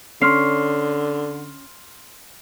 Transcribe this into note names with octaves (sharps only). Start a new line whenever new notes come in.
D3 C#4 C6 F6 C7